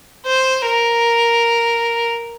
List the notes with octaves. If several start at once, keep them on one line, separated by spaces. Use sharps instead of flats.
C5
A#4